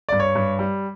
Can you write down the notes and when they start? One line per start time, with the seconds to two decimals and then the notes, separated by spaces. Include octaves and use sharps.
0.09 G2 D5
0.20 C#5
0.35 G2
0.59 G3